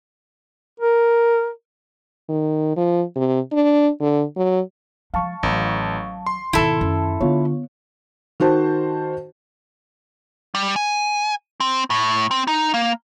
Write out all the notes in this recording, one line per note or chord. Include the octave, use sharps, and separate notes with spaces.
A#4
D#3
F3
C3
D4
D3
F#3
F3 G#3 F5 A5 C#6
A1 D#3 F#3
C6
G#2 B2 D#3 E4 A4 A5
F#2
D3 B3 F4 C#5
D#3 F#4 C5 A5
G3
G#5
C4
A2
C4
D#4
A#3